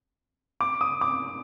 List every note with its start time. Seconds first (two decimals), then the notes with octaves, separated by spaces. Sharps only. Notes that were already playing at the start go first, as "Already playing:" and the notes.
0.61 D6
0.81 D#6
1.01 D6